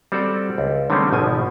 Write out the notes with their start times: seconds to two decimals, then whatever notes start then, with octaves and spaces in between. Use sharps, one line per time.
0.12 G3 C4 F#4 A4 D5
0.58 C#2
0.90 D3 D#3 G3 A3 C4 C#4
1.13 G#1 B2 F3 G#5